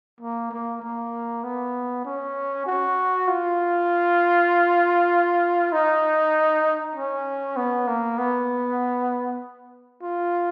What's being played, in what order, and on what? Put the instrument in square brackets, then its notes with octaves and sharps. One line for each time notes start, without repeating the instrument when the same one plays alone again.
[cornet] A#3
A#3
A#3
B3
C#4
F#4
F4
D#4
C#4
B3
A#3
B3
F4